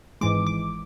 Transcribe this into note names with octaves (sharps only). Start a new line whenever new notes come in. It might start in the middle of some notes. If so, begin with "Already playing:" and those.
G#1 G#2 E3 G#3 D6
D6